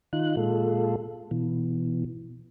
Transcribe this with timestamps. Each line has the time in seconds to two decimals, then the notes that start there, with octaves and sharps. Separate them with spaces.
0.13 D#3 D#4 F4 F#6
0.37 A#2 G#3 F4 A4
1.31 B2 E3